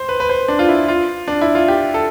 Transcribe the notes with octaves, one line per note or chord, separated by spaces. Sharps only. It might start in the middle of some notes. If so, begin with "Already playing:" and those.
Already playing: C5
B4
B4
C5
D4
F4
E4
F4
D4
E4
F4
G4
A4